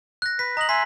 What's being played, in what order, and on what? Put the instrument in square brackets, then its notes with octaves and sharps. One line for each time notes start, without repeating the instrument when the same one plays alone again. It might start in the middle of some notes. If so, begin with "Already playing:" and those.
[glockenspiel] F#6 A#6
[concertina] B4 [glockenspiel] B6
[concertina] D#5 [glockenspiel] A#5 F#7
[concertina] E5 G#5 C6 [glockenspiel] B6